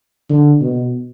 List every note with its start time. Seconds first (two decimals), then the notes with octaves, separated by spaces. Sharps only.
0.30 D3
0.61 B2